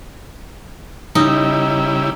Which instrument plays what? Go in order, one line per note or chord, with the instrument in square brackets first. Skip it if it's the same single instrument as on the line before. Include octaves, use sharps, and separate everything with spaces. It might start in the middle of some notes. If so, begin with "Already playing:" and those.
[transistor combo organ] C#3 G3 E4 [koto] D#4